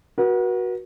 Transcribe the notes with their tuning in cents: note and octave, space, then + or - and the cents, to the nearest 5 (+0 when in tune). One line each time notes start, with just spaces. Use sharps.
F#4 +0 B4 -45